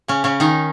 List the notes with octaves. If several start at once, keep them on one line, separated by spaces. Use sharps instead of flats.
C#3 C#4
C#3 C#4
D#3 D#4